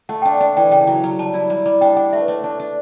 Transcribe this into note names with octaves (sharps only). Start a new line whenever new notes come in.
A3 F#5
D4 G5
F#5
D4
E3 G5
C#3 G5
F#3
F#3
G3 A5
E4
G3
G3
D4 G5
D4 F#5
A3 E5
B4
A3 C#5
D4
D4